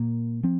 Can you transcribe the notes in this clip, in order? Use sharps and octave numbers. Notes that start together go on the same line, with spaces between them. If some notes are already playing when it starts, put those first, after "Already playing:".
Already playing: A#2 A#3
F3 C4